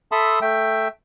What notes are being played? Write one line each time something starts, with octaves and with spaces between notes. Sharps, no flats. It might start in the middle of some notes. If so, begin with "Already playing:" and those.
A4 E5 A5 B5 C6 D#6
A3 E5 G5